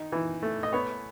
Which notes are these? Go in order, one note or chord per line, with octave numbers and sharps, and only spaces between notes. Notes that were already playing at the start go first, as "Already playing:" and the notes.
Already playing: D#3 D#4
E3
A3
D#5
B3 C#5